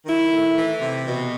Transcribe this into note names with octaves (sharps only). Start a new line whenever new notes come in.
D#3 E4
A3
E3
C3
B2